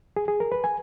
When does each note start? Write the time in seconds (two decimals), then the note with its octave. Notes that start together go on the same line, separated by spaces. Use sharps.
0.17 G#4
0.28 G#4
0.40 A#4
0.52 B4
0.64 G#5